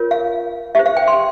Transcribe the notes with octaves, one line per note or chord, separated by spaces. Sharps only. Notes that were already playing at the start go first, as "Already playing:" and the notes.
Already playing: F4 A#4 C#5
F5
G4 C5 E5
F5
G5
C6